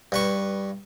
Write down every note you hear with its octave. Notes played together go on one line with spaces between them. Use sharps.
G2 B4 C#6